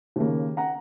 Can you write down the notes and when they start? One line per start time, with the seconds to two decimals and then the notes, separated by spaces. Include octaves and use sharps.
0.16 D#2 C#3 A#3
0.57 F#5 A#5